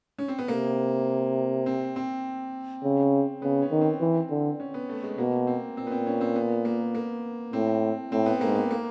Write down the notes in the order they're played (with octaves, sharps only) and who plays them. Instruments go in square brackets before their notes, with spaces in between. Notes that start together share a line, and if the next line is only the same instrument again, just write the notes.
[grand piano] C#4
C4
B3
[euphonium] C3 [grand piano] A#3
[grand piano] C4
C4
[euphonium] C#3
[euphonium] C#3 [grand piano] B3
[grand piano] C#4
[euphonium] D#3
[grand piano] C4
[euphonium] E3
D3
[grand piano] C#4
B3
A3
G#3
[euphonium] B2 [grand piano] A#3
[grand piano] C4
[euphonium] A#2 [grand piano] C4
[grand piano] B3
C4
C#4
C4
B3
A#3
A#3
[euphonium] A2 [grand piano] C4
[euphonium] A2 [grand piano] C4
[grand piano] B3
[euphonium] G#2 [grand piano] A#3
[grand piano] B3
A#3